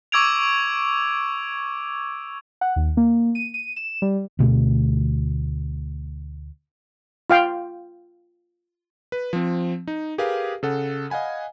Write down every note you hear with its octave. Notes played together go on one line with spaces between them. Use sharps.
C#6 D6 E6 G#6 D7 F7
F#5
D#2
A#3
D#7
D#7
E7
G3
D2 B2 A3
F4 F5 G5
B4
F3 C4
D#4
G4 G#4 A#4 B4 F5
C#3 A4 F#5
D#5 F5 F#5 G#5 B5